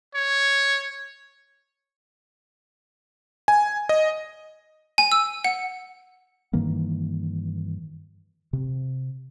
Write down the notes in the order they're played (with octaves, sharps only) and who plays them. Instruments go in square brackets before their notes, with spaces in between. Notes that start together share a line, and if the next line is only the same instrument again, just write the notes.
[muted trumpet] C#5
[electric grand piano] G#5
D#5
[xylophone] G#5
E6
F#5
[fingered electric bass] G2 D#3 E3 A#3
C3